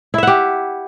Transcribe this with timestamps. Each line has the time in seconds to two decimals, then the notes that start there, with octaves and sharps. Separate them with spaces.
0.14 E4
0.18 E5
0.23 F#5
0.27 G4